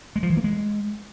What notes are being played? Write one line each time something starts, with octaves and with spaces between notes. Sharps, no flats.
G#3
F3
E3
A#3
G#3